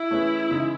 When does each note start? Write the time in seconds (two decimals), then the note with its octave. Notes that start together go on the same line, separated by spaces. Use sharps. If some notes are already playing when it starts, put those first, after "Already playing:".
Already playing: E4
0.11 E3 A3 C#4 G#4 B4
0.50 C#3 E3 G#3 D#4